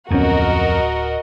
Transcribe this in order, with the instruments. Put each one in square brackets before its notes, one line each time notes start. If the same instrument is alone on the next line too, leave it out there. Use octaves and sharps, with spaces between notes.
[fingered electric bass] D1 B3 C#4 [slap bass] F2 [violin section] F#4 A#4 D#5